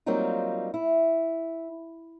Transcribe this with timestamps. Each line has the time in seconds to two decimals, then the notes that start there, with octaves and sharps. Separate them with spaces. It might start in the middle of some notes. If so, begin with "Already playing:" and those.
0.06 F#3 G3 A#3 C4 D#4 F4
0.74 E4